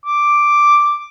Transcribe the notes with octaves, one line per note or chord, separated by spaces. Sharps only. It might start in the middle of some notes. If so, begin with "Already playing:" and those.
D6